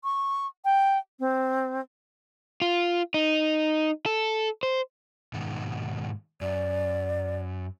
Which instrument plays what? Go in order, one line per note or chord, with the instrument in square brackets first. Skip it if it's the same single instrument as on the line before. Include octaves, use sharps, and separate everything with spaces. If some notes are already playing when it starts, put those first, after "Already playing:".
[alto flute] C#6
G5
C4
[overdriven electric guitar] F4
D#4
A4
C5
[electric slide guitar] G#2 B2 D#3
[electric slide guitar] F#2 [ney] D5